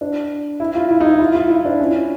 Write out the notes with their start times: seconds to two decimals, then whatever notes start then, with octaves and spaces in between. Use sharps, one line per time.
0.01 D4
0.60 E4
0.75 F4
0.90 E4
1.01 D#4
1.05 E4
1.20 F4
1.35 F4
1.50 E4
1.65 D4
1.80 C#4